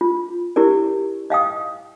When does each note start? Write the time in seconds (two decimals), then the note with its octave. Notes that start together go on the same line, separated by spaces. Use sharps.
0.01 F4
0.56 E4 G4 A#4 D5
1.30 D#5 F5 G5 D#6